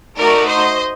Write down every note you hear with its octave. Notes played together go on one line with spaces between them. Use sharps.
A3 D#4 F#4 A#4 D5
C5 D#5